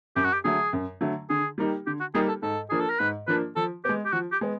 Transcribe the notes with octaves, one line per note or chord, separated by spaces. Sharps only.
F#2 G4
F#4
G4
D3 F#3 A3 G#4
F#2
D3 F#3 A3
D3 G#4
G3 A#3 D#4 G4
D3 G4
F#4
G3 A#3 D#4 G4 G#4
A4
G#2 A4
F3 A#3 D4 G#4
A4
A#4
G#2 B4
F3 A#3 D4 B4
F3 A4
G#3 B3 G4
G4
F3 F#4
G4
G#3 B3